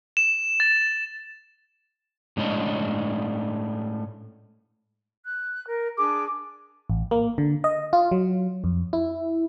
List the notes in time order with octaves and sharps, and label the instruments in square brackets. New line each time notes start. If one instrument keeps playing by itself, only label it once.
[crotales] E7
A6
[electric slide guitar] A2 G#3 C#4 D4 C#5 D#5
[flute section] F#6
A#4
D4 G#4 D6
[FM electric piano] A1
A#3
D3
D#5
F4
F#3
F2
E4